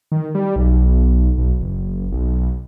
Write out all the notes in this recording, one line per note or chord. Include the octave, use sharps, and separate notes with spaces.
D#3
G3
B1
B1
F#1
B1